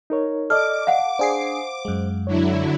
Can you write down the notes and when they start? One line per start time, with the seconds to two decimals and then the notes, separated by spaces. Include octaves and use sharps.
0.10 D#4 A#4 C#5
0.50 A4 D5 D#5 D6 F6
0.87 F5 F#5
1.19 D4 G#4 C5 C7
1.85 F#2 G#3
2.27 D3 F#3 E4 C#5